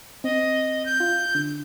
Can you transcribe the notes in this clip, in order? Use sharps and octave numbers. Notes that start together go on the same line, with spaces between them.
C4 D#5
G6
F4
D3